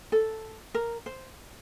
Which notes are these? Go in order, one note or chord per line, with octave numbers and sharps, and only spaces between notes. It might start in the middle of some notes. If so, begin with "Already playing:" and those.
A4
A#4
C5